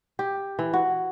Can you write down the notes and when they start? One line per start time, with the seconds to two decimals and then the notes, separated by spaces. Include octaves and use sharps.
0.19 G4
0.59 E3
0.74 F#4